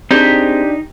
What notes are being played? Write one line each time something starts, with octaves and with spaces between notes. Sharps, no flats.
C4 D4 D#4 G4 G#4 C5